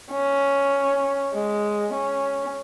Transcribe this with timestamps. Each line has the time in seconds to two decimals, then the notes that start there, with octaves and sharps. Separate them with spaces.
0.12 C#4
1.33 G#3
1.93 C#4